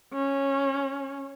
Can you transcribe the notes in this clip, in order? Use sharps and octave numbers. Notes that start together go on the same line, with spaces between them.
C#4